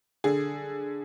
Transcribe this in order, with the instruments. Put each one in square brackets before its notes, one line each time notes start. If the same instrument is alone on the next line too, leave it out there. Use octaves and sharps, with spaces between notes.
[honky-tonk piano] D3 G#4